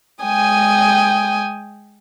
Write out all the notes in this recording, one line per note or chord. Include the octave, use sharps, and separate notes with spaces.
G#3 G5 G#5 D#6